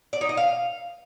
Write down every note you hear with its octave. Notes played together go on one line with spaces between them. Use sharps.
D5
D#4
D#5
F5